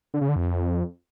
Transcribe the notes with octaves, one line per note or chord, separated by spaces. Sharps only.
D3
C#3
D3
F2